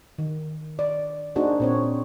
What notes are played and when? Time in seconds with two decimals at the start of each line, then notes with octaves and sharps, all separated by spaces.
0.18 D#3
0.79 D5
1.36 A#3 D4 D#4 F#4 G#4 C5
1.60 A#2 C4 C#5